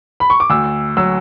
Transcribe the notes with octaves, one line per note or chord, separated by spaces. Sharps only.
B5
C#6
D6
D2 E6
F#3 E6